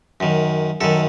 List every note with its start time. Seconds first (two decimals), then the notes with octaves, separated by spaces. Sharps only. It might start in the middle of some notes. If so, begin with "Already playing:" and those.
0.20 F#2 D#3
0.81 F#2 D#3 A4